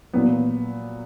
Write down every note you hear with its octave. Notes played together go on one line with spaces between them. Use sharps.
A#2 F#3 B3